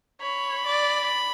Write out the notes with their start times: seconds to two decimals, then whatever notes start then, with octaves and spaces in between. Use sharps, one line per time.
0.21 C#5 B5
0.67 D5